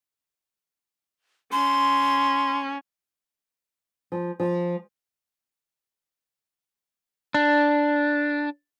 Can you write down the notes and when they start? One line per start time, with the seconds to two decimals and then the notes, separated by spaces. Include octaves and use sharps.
1.52 C#4 C6
4.12 F3
4.40 F3
7.34 D4